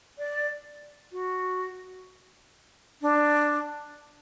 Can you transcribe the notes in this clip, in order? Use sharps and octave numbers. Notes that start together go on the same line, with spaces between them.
D5
F#4
D4